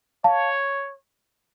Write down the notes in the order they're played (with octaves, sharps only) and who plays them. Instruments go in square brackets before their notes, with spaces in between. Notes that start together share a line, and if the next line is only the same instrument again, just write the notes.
[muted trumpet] C#5 [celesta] F5 A5